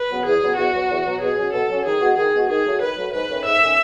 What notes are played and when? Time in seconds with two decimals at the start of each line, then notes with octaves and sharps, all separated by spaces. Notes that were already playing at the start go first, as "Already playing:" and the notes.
Already playing: B4
0.10 C#3 F#3 B3
0.26 E2 G#4
0.41 C#3 F#3 B3
0.57 E2 F#4
0.74 B2 F#3
0.89 E2
1.05 B2 F#3
1.21 B2 G#4
1.37 F#3 C#4
1.53 B2 A4
1.69 F#3 C#4
1.85 D#3 G#4
2.01 G#3 B3 F#4
2.17 D#3 G#4
2.33 G#3 B3 F#4
2.49 D#3 G#4
2.65 F#3 A3
2.81 D#3 B4
2.97 F#3 A3
3.13 G#2 B4
3.29 D#3 A3 C#4
3.45 G#2 E5
3.61 D#3 A3 C#4